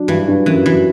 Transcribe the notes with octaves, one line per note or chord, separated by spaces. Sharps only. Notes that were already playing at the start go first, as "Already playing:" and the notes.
Already playing: F#3 D4
G2 E3
G2
F#2 E3
E3 F#3